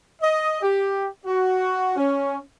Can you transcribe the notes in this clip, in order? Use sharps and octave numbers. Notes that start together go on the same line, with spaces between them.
D#5
G4
F#4
C#4